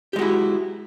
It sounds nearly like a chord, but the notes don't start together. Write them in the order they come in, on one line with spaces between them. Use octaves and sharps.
G4 G#3 F#4 E4